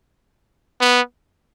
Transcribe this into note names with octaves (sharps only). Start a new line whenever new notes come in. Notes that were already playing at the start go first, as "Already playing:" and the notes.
B3